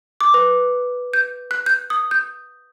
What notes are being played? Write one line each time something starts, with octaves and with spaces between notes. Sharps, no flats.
D6
B4
G6
F#6
G6
D#6
G6